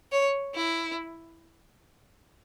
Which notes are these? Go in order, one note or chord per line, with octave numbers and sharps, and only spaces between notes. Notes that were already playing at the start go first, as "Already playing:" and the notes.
C#5
E4